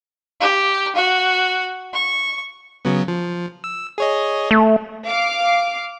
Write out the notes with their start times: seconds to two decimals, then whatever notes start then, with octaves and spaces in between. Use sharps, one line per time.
0.39 G4
0.93 F#4
1.92 C#6
2.85 C#3 F#3 B3
3.08 F3
3.64 E6
3.98 G#4 C#5 D#5
4.51 A3
5.07 F5 D6